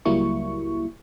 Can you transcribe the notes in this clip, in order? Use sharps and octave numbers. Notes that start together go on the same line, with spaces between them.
C#2 F#3 G3 A#3 E4 C#6